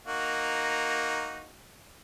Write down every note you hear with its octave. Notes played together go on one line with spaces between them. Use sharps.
A#3 D#4 F#4